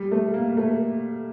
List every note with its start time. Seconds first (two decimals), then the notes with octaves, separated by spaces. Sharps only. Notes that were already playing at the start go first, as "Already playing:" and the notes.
Already playing: G3
0.11 A3
0.34 A#3
0.57 A3